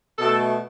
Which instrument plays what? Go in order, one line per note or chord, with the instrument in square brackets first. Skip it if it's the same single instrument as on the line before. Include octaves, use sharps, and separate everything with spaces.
[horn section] B2 A3 A4